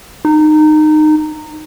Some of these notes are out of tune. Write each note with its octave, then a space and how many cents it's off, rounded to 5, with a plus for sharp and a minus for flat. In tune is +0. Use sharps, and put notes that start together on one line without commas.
D#4 -20